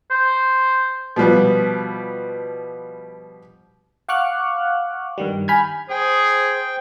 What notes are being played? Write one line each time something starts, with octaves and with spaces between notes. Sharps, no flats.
C5
B2 F3 G3 B3
F5 F#5 C#6 D6 F6 F#6
G2 D#3 G3
G#5 B5 F6 G6 G#6
G#4 C5 G5